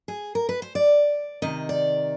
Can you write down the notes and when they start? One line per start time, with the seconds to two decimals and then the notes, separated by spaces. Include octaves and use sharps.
0.08 G#4
0.35 A#4
0.49 B4
0.62 C5
0.75 D5
1.42 C3 D#3 D#5
1.69 D5